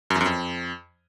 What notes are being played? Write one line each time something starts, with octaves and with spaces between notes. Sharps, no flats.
F#2
E2
F#2
F2